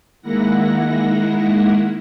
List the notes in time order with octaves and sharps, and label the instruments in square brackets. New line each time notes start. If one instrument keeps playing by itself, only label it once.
[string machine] D#3 G#3 A#3 E4 F#5 A#6